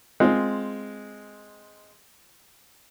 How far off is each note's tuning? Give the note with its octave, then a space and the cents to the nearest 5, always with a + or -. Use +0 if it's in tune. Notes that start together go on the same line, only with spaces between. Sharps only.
G#3 +0 C4 +0 F4 +0